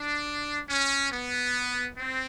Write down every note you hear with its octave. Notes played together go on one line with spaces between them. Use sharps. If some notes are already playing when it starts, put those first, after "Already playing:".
Already playing: D4
C#4
B3
C4